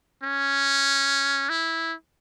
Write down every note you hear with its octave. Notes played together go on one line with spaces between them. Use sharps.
C#4
E4